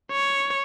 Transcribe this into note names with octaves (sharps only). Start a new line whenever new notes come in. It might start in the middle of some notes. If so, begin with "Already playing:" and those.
C#5